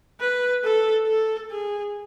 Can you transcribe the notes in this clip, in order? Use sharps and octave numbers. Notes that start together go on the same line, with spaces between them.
B4
A4
A4
G#4